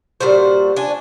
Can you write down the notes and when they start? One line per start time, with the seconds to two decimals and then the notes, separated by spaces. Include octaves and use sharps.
0.20 A#2 G3 F#4 C5
0.76 D4 G#5